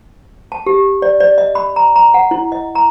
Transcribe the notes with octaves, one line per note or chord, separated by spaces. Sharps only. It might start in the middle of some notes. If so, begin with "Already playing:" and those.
A5
G4
D5
D5
D#5
B5
A#5
A#5
F#5
E4
D#5
A#5